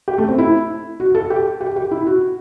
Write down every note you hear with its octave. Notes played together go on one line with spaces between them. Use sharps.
G4
A3
C4
E4
F#4
A4
G4
G4
G4
E4
F#4